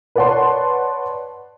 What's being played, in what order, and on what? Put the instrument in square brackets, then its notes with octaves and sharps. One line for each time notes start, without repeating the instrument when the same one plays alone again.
[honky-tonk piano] B4 C#5 D5 F#5 A5 C6